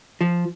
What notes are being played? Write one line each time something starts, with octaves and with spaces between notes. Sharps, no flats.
F3